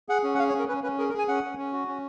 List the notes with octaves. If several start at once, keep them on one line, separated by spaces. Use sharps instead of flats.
G#4 F#5
C#4
F#5
G#4 F5
C#5
C#4
A#4
C#4 B4
C#4 B4
G#4 A#4
A#4
G#4
G#5
C#4 F#5
C#4
C#4
F#4
C#4